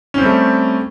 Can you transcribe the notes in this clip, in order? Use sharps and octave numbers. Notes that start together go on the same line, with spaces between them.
G3 A3 C4 C#4